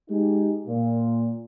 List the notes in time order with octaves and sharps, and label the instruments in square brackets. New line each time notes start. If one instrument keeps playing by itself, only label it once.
[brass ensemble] G#3 D#4 G4 G#4
A#2